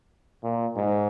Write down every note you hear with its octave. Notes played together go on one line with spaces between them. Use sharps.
A#2
G#2